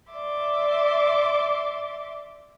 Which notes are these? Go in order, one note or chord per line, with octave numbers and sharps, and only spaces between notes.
D5 E5 C6 D6